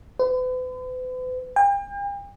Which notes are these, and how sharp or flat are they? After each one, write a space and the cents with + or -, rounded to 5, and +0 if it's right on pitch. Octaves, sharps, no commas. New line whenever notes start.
B4 +45
G5 +40